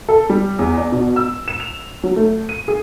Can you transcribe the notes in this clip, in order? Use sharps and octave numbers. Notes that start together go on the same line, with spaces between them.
A4
G3
E2
D5
B2
E6
E7
F7
F#3
A3
D#7
G#4